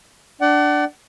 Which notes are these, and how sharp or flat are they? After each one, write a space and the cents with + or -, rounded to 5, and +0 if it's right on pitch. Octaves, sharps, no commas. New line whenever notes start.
D4 +0 D5 +0 F#5 +35